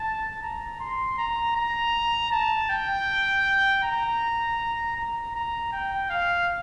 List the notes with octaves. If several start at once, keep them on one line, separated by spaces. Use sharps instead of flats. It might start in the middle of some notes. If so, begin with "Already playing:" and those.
Already playing: A5
A#5
C6
A#5
A#5
A5
G5
A#5
A#5
A#5
G5
F5